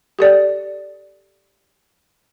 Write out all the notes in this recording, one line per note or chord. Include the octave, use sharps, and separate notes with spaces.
G4 A4 D5